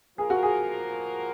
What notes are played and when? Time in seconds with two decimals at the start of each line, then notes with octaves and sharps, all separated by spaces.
0.18 F3 A#3 F4 G#4 A#4
0.30 F#4
0.43 G#4